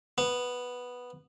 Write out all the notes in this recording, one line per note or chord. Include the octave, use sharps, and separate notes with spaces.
B3